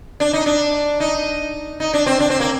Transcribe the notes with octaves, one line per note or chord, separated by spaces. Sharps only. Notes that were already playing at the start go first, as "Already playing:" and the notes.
D4
D#4
D4
D#4
D#4
D4
C4
D4
C4
A#3